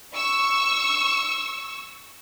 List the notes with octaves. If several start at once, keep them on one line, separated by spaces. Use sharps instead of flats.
C#6 E6